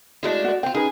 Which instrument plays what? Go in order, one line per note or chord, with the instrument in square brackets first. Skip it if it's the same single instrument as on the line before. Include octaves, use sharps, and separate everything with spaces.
[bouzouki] G#3 A3 D4 [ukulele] E4 F#4 D#5
[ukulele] F#4 D5
[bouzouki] C4 F4 [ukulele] G5
[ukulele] C#4 D#4 B4 [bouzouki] G#4